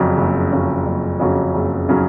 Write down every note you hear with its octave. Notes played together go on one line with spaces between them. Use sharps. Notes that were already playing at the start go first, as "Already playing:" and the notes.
Already playing: F#1 F2 C#3 F#3 C#4
F#1
F2 C#3 F#3 C#4
F#1
F2 C#3 F#3 C#4
F#1
C#3 F#3 C#4